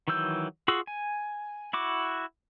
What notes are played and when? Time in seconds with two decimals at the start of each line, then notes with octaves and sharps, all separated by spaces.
0.08 D#3 E3 F#3 E6 G6
0.68 F4 F#4 G#4 E6
0.87 G#5
1.73 E4 F#4 D6